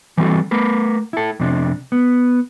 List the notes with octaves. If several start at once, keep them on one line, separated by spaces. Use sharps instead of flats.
E3 G3 B3 C4 F#4 A4
A3 A#4 B4
E4 A4
F2 C3 D4
B3